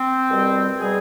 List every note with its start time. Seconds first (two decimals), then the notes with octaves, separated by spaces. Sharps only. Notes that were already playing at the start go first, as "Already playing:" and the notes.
Already playing: C4
0.29 C2 B2 G3
0.78 B2 G3 G#4